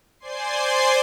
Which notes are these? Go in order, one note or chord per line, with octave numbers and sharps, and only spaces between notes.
C5 D5 G#5 C6 C7